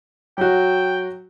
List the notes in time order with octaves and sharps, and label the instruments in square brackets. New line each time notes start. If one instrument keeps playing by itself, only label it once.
[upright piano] F#3 F#4 [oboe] G5